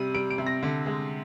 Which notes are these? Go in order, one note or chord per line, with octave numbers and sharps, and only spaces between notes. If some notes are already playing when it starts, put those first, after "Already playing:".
Already playing: C3 G3 D#7
G3 D7
D7
C3
A#6
D3
G#3